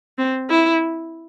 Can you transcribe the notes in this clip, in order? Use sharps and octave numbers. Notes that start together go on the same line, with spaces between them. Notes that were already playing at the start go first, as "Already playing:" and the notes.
C4
E4